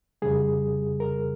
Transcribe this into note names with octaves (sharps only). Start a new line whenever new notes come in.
F2 C#3 G3 G#4
A#4